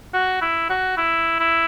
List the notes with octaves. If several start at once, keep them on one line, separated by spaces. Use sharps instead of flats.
F#4
E4
F#4
E4
E4